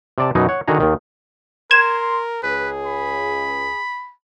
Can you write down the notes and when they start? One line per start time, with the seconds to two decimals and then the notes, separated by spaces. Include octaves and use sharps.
0.18 C3 D5 A5
0.35 F#2 B2 F#3 D#4
0.49 C#5 F#5
0.68 D3 D#3 F#4 G#4 A#5
0.80 D#2 D#3
1.71 A#4 C6 G#6 E7
2.43 C#2 G#4 B4
2.86 B5